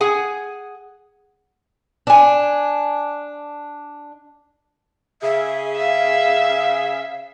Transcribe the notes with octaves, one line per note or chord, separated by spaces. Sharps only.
G#4 F#5 G#5
D4 G#5
C#3 G#4 E5
E5 F5